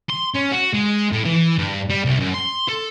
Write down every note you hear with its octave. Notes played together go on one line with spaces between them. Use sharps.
C6
C#4
F#4
G#3
A2
E3
G2
G3
C2
F#2
C6
A4